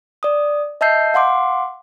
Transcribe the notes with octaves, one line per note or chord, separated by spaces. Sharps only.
D5 D#6
D#5 E5 A5 E6 G6 C7
F5 F#5 C6 D6